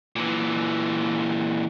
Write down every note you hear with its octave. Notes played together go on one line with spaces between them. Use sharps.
A#2 E3